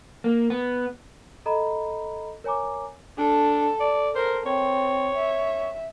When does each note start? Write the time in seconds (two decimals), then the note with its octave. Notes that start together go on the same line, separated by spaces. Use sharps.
0.24 A#3
0.50 B3
1.46 A4 D#5 A#5 B5
2.44 A#4 C#5 G#5 A#5 D6
3.18 D4 A4
3.80 D5
4.15 A#4 C5
4.46 C4 C#5
5.15 E5